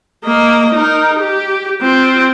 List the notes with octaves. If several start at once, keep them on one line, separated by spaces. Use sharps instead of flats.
A#3 D#5
D#4 A#4
G4
C4 F4